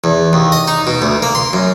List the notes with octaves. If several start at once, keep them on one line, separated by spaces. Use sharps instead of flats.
E2
D#2
D#5
D#4
B2
D2
A#3
C6
F#2